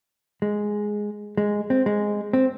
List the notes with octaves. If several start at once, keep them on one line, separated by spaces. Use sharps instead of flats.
G#3
G#3
C4
G#3
C4